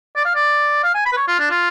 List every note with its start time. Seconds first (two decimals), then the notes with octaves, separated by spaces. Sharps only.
0.16 D5
0.25 F5
0.35 D5
0.84 F5
0.94 G#5
1.06 B5
1.12 B4
1.17 C#5
1.28 F4
1.39 D4
1.50 F4